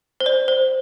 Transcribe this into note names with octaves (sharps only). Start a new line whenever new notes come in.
C5
D5
C5